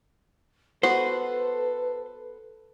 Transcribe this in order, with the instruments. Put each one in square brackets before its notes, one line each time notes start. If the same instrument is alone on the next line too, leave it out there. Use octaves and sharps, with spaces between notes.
[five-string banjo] B3 F#4 [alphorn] A4 [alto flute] B4 [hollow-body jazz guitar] C5